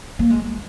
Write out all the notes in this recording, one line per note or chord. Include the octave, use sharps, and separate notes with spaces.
A#3
G#3